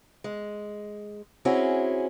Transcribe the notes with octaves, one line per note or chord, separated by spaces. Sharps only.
G#3
C4 C#4 E4 F#4 G#4